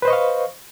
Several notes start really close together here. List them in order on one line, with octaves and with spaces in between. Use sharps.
B4 C5 D#5 C#6 F5